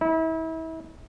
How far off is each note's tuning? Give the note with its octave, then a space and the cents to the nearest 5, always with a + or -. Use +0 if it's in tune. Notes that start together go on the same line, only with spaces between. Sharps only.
E4 -35